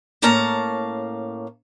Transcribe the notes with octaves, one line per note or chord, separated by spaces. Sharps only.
A2 A#3 C#4 F5 A5 A#5